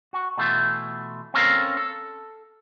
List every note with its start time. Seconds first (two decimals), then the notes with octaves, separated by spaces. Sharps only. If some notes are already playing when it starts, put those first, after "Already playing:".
0.13 F#4
0.38 B2 E3 A3 F4
1.34 C4 C#4 A4 A#4 D5 F5
1.77 A4